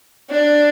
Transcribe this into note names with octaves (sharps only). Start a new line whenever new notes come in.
D4